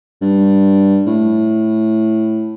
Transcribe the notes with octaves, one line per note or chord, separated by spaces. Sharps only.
G2
A2